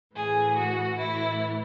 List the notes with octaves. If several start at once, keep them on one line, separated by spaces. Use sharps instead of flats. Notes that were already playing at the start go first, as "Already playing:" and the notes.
A2 E3 G#4
F#4
A2 E3 E4